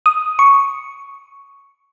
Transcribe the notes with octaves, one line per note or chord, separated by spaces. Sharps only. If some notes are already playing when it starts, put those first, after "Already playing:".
D#6
C#6